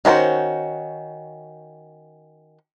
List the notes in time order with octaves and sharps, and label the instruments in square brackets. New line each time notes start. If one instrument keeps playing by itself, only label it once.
[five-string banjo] D#3 C#4 D4 F#4 C5